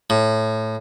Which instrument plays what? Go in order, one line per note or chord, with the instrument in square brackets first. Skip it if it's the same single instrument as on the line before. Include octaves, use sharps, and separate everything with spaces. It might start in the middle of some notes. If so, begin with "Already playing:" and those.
[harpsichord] A2